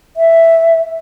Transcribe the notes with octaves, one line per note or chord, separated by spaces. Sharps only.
E5